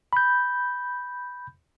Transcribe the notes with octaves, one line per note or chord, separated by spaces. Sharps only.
B5 G6